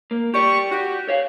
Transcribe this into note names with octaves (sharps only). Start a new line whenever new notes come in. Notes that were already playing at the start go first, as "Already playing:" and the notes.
A#3
G4 D5 C#6
F#4 G4
C#5 F5